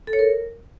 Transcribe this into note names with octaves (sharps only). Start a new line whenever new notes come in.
A4
C#5
A#4